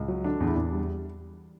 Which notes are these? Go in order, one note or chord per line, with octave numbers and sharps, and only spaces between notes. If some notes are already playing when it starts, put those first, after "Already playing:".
Already playing: C#2
F#3
D3 D4
E2
E4
E2 D4
G3